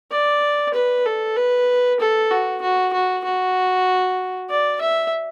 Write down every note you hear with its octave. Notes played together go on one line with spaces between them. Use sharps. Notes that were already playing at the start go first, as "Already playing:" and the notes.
D5
B4
A4
B4
A4
F#4
F#4
F#4
F#4
D5
E5